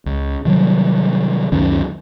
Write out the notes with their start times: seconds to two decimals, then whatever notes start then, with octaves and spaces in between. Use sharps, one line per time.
0.06 C#2
0.45 C3 D#3 F#3 G3
1.52 C#2 F#2 D#3 C#4